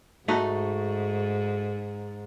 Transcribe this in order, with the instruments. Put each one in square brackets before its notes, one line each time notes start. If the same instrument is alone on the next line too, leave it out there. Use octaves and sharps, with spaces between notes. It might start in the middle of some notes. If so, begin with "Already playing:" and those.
[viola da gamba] G#2 [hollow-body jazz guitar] A3 D#4 F#4